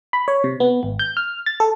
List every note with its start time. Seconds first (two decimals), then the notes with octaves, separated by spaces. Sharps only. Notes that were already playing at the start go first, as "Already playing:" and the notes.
0.13 B5
0.28 C#5
0.44 C3
0.60 B3
0.83 G#1
0.99 G6
1.17 F6
1.46 A6
1.60 A4